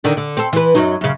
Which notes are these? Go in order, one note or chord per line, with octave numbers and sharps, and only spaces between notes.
D3 D#3 D4
D3
C4 A4
E3 B4
F#2 F#3 D#4
F#2 C#3